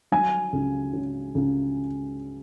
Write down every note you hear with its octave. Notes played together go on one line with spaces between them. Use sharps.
F#3 G#5
C#2
C#3
C#2